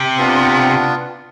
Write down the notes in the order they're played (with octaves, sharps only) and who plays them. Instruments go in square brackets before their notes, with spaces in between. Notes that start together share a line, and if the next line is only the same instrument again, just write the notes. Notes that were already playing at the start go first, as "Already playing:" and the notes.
Already playing: [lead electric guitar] C3
[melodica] B3 D4 F4